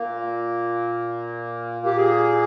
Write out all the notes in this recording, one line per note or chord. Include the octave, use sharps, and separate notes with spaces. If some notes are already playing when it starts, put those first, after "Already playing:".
Already playing: A#2 A#3
G4
G#4